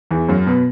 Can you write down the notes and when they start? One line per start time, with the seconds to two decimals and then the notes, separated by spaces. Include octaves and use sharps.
0.11 E2 E3
0.28 F#2 F#3
0.46 B2 B3